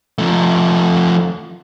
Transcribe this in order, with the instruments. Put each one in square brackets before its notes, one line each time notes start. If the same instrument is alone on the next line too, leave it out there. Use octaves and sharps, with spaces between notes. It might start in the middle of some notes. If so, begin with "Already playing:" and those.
[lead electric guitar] F3 A3